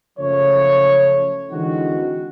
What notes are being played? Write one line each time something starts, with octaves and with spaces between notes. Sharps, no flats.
F#1 C#3 F3 A3 C#5
D3 E3 G#3 C4 D#4 F#4